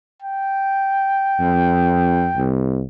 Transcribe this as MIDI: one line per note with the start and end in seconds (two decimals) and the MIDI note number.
0.23 2.51 79
1.40 2.30 41
2.37 2.82 36